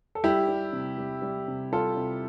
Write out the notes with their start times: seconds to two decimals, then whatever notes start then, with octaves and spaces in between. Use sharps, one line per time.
0.15 A4
0.24 G3 E4 G4
0.48 G3
0.73 C3
0.98 G3
1.22 G3
1.48 C3
1.72 G3 F4 A4
1.97 C3